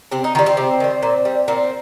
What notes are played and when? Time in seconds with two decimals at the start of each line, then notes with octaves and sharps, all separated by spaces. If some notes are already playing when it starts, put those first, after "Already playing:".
0.11 C3 C4
0.24 D#4
0.35 D#3 G3 F4
0.46 C4
0.57 C3
0.80 D#3 G3
1.03 A#2
1.25 G3
1.48 A#2 C4